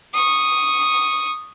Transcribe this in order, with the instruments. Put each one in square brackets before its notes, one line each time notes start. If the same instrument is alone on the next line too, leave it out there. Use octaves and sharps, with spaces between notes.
[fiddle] C#6 D#6